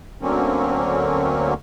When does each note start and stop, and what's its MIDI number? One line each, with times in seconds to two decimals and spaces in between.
0.22 1.54 38
0.22 1.54 50
0.22 1.54 54
0.22 1.54 58
0.22 1.54 60
0.22 1.54 61